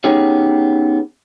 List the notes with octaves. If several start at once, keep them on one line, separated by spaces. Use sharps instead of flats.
B3 C#4 D#4 G4 G#4 C#5